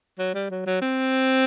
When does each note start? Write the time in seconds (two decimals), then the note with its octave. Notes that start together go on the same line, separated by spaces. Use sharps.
0.19 F#3
0.35 G3
0.51 F#3
0.67 F#3
0.82 C4